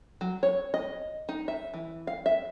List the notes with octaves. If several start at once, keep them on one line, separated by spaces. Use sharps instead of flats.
F#3
C#5
D#5
D#4
E5
E3
F5
E5